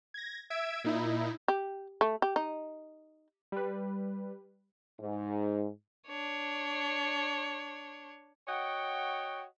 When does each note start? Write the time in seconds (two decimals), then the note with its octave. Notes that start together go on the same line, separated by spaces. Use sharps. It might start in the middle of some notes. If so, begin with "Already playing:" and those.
0.14 G#6 A#6
0.50 E5 E6 G#6 D7
0.84 A#2 D#4 E4
1.48 G4
2.01 A3
2.22 G4
2.36 D#4
3.52 G3 B4
5.00 G#2
6.07 D4 C#5
8.48 F#4 C#5 D#5 F#5 G5